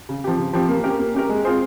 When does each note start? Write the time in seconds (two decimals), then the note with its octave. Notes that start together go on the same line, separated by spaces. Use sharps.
0.09 C#3
0.24 F3 C4 G4
0.38 C#3
0.53 F3 C4 G4
0.69 A#3
0.84 C#4 G4 A#4
0.99 A#3
1.14 C#4 G4 A#4
1.29 G#3
1.45 C4 F4 G#4 C5